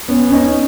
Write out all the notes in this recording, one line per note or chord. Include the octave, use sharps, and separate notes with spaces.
B3 C#4
C#4 D#4